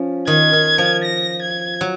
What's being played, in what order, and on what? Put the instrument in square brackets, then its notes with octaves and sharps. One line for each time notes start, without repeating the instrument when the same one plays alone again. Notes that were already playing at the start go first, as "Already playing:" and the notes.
Already playing: [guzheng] F3 C#4
[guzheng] D#3 [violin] G#6
[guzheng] D#3
F3
[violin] A#6
G#6
[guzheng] F#3